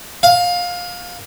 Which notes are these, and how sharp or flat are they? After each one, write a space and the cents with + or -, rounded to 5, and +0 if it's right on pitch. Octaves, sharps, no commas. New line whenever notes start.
F5 +20